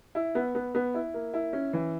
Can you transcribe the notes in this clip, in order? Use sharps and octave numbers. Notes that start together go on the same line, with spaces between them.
E4
B3
B3
B3
E4
A#3
E4
C#4
E3